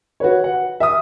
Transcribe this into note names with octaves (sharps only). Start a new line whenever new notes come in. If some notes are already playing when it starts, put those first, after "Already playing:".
F#4 B4 C#5
F#5
E5 D#6